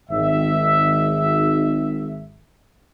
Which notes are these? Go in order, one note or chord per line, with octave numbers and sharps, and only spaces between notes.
G#1 E5